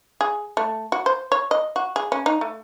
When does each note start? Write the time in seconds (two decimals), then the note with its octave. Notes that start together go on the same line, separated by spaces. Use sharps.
0.21 G#4
0.57 A3
0.92 F#4
1.06 C5
1.32 C#5
1.51 D#5
1.76 F#4
1.96 G#4
2.12 C#4
2.26 D#4
2.41 A3